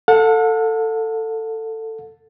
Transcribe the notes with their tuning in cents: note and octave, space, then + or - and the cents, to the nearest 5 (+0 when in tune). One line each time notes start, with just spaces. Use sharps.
A4 +15 F#5 -45